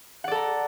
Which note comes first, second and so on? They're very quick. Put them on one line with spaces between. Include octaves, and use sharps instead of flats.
F#5 D5 A4 A#5